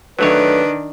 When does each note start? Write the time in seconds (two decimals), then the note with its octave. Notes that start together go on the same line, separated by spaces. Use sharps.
0.19 D#3 F#3 A3 D4 B4 C#5